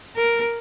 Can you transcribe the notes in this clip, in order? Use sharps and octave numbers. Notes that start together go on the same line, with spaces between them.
A#4